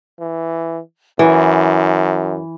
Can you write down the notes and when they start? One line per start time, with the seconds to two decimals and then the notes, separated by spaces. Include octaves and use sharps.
0.20 E3
1.19 F#2 E3